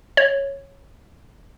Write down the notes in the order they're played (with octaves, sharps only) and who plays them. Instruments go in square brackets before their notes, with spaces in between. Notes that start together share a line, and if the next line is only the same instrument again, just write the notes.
[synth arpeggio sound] C#5